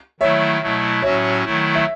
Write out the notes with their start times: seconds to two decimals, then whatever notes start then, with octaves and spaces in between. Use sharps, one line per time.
0.20 D#3 F#3 A3 E4 C#5 E5
0.61 B2 F#3 A3 E4
1.03 A2 F#3 C#4 F#4 C#5 E5
1.44 D#3 F#3 A3 E4
1.75 E5